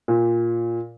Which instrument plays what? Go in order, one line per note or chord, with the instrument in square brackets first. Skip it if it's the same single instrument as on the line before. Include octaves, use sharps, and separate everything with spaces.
[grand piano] A#2